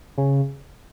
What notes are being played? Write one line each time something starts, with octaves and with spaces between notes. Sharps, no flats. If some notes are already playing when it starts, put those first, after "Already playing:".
C#3